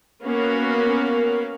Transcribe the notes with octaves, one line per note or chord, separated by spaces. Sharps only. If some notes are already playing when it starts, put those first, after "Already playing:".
A#3 B3 C#4 F#4 A#4 F5